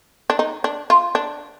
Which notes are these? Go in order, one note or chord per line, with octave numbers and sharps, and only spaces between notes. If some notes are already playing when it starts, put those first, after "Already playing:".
D4
D#4
D4
F4
D4